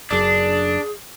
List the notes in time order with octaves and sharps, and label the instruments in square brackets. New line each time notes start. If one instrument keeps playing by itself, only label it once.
[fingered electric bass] F#1 F#2 [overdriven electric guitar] D4 [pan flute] G#4